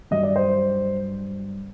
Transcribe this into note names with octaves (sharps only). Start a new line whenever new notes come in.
G2 F#3 D#5
D5
C5